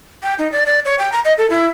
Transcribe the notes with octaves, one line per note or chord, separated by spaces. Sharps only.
G5
D#4
D5
D5
C#5
G5
A#5
D#5
A4
E4